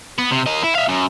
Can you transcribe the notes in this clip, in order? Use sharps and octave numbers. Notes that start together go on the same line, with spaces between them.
B3
C3
A#3 D#5
E4
E5 F5
F#2